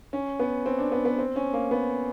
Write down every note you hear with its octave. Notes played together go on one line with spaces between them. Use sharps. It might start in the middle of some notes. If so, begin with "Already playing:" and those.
C#4
B3
C4
D4
B3
B3
C4
C#4
A#3
B3